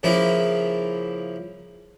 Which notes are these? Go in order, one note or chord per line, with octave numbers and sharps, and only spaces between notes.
C#3 F3 A#3 E4